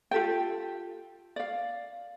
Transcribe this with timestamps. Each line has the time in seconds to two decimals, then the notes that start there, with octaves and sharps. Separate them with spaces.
0.11 F4 G4 A4 G5
1.36 D5 F5